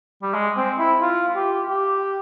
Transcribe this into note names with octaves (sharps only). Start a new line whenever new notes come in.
G3
G#3
C4
E4
F4
G4
G4